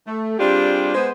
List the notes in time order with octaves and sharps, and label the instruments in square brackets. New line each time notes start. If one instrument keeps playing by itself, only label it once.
[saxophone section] A3
G3 C4 D4 F4 G4 G#4
G#3 B3 C5